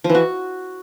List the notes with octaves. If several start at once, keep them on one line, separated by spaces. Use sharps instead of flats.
F3
E3
F#4